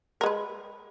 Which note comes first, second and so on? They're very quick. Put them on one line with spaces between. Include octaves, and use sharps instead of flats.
A#4 G#3 B4